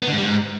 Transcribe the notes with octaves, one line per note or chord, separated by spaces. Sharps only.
B3
D3
G#2
G3
G#2